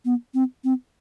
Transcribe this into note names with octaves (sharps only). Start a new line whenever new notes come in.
B3
C4
C4